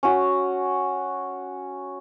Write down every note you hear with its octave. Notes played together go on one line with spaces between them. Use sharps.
C#4 F#4